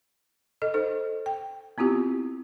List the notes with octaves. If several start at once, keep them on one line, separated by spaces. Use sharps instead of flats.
A4 D#5
D#4 A4 C5
G5
B3 C4 E4 F4 G4